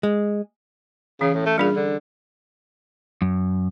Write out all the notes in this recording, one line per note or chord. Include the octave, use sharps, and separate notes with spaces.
G#3
C#3 E3 C#4
A2
A3
A#2 G3 D4 G#4
D3
F#2